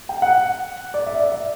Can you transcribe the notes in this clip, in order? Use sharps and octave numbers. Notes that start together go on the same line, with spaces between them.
G5
F#5
D5
E5
D5
E5